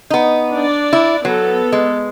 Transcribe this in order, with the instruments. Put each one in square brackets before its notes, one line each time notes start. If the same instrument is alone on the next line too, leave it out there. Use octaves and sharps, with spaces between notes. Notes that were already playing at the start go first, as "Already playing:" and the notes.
[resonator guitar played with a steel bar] B3 D#4
[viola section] D4 D5
[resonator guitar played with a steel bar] E4
[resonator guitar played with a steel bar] F#3 [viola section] B3 A4
[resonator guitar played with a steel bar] G#3